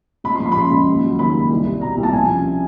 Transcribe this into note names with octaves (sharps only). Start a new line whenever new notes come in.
C#2 B5
C6
F3
C6
B5
C#3 C6
C#2
D#2
F#3
D#3 B5
D#2
C2
G3
B2 A#5
C2
A5
F3 G#5
C#3